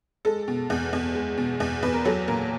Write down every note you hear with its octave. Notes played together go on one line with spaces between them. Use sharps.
G#3 A4
B2
E2
E2
G#3
B2
E2
E2 B4
A#4
F#3 A4
A#2 A#4